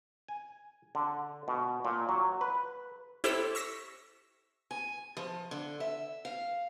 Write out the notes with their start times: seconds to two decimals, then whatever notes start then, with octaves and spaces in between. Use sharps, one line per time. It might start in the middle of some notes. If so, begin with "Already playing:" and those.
0.28 G#5
0.95 D3
1.48 B2
1.85 A#2
2.09 F#3
2.41 B4
3.24 E4 G4 A4 C5 E6 B6
3.55 C#6 E6 A#6 B6
4.71 G#5
5.17 F3
5.51 D3
5.80 E5
6.25 F5